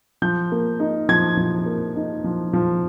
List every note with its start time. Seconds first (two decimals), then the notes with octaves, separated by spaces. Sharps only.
0.22 F3 G6
0.52 A#3
0.80 D#4
1.09 F3 G#6
1.37 F3
1.66 A#3
1.96 D#4
2.24 F3
2.53 F3